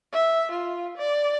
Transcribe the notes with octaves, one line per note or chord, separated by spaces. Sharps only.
E5
F4
D5